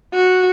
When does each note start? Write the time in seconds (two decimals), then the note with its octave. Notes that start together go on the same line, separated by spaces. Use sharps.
0.14 F#4